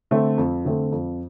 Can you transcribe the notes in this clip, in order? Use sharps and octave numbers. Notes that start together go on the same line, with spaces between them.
D3 A3 C4
F2
D3 A3 C4
F2